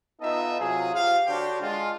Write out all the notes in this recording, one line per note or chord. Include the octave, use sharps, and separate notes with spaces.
B3 D#4 F4 A4 D#5 E5
C3 F#3 F4 G#4
F4 G4 C5 F5
D3 D4 F#4 G4 C5 C#5
G#3 D4 F4